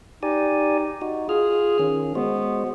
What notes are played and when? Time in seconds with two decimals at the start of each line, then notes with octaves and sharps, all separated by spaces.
0.23 D#4 G4 D5 G#5
1.02 D#4 F#4
1.29 F4 G#4 F6
1.79 D#3 C#4
2.15 G#3 B3 F#4 C5